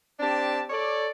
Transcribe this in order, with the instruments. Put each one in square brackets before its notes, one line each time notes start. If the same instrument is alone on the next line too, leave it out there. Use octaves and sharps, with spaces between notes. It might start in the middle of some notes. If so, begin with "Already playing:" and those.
[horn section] C4 D4 G4 A5
A4 C#5 D5